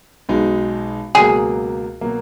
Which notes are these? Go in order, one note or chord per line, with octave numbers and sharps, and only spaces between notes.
B1 B2 G#3 D#4 G#4
C#2 B2 F#3 A#3 G#4
B2 F#3 A#3